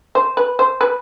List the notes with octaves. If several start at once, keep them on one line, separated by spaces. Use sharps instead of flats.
C5
B4
C5
B4